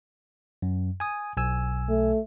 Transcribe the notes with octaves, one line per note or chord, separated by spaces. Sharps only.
F#2
G#5 D#6
B1 G#5 E6
A3